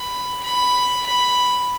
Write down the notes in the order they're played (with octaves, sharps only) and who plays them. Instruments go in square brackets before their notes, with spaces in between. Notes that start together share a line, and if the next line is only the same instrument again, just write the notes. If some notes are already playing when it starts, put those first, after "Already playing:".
Already playing: [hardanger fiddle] B5
B5
B5